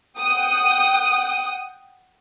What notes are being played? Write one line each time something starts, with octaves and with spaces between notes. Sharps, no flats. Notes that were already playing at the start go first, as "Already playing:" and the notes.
F#5 G5 D#6